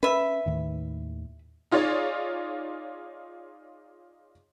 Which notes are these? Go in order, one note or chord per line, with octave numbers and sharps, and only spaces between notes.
C#4 B4 E5
D#2 A2 D#3
D#4 F4 G#4 C#5 D5